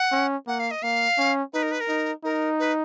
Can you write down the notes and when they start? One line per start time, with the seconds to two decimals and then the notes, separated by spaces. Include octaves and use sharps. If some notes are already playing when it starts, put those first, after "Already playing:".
Already playing: F#5
0.12 C#4
0.47 A#3 F#5
0.59 F5
0.71 D#5
0.83 A#3 F5
1.18 C#4
1.53 D#4 B4
1.63 A#4
1.71 B4
1.80 A#4
1.88 D#4
2.24 D#4 A#4
2.59 B4